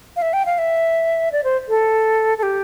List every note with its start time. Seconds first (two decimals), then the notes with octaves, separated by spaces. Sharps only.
0.16 F5
0.22 E5
0.33 G5
0.46 F5
0.58 E5
1.32 D5
1.44 C5
1.69 A4
2.38 A4
2.43 G4